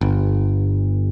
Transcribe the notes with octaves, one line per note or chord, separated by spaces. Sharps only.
G1